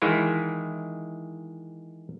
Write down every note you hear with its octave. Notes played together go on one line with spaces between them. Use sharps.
D#3 E3 G#3 E4 F4